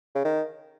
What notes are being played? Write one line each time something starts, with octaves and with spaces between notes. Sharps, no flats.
C#3
D#3